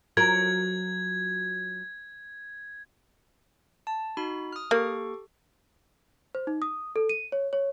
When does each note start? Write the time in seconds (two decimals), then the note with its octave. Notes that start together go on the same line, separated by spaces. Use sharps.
0.17 F#3 F4 A#4 G#6
3.87 A5
4.17 D#4 F#4 B5
4.53 D#6 F6
4.71 A#3 G4 A4 C#6
6.35 C5
6.47 D#4
6.62 D#6
6.96 A4
7.09 D#7
7.32 C#5
7.53 C#5